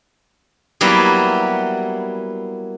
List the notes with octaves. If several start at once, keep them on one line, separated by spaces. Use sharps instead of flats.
F#3 G3 A#3 B3 E4